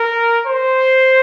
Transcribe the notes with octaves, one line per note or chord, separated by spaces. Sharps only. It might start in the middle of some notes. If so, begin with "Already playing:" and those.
Already playing: A#4
C5